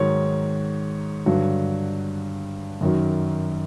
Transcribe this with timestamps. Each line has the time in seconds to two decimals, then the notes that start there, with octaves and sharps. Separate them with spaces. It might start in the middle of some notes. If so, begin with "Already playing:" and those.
Already playing: G#2 D#3 F#3 C#5
1.26 G2 D3 F#3
2.81 F#2 D#3 F#3